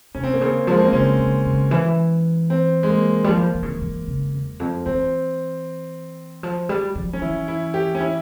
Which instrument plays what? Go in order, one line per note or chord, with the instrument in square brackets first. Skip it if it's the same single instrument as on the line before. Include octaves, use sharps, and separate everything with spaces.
[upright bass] C3 [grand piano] C#4
[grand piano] C4
A#3
[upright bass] C#3 [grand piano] C4
[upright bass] F3 [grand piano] G#3
[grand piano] A#3
C4
[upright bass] C#3 [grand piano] C#4
[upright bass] C#3
C#3
E3
[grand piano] C4
G#3
A#3
[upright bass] G3
F3
E3
C#3
E3
E3
C#3
E2
F2
[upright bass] E3 [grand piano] C4
[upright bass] F3
G3
F3
[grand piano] C#4
[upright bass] E3 [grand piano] E4
[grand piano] E4
G4
C#4
E4